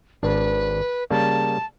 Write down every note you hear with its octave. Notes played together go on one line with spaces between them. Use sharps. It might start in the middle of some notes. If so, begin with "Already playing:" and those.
G#1 D4 B4
C#3 G3 A#3 A5